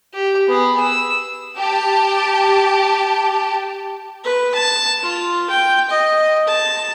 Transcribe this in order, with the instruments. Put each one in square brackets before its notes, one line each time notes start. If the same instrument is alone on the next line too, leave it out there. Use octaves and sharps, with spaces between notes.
[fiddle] G4
B3 G#4
E6
[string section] G4 A5
[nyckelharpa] B4
A5
F4
G5
D#5
A5